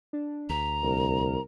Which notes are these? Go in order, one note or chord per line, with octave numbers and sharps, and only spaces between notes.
D4
D2 A#5 B6
C2 A#4